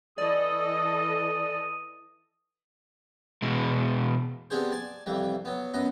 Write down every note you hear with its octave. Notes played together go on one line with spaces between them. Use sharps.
E3 A4 D5 D#5 D#6
E2 B2 G#3
B3 C4 D4 G4 G#4 C5
D5 G#5 A5
C2 F2 E3 G3
F#3 B3
F#2 B3 D#5